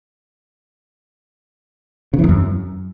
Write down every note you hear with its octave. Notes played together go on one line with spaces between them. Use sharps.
C#3
E3
E2
F#2